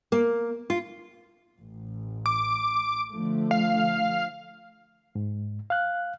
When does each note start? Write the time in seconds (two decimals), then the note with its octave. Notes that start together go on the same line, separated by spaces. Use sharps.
0.12 A#3
0.70 F4
1.58 A1
2.26 D6
3.12 D3 F3 A3
3.51 F5
5.15 G#2
5.70 F5 F#6